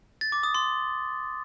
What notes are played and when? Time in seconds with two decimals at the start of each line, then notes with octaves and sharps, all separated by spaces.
0.21 A6
0.32 D6
0.43 D#6
0.55 C6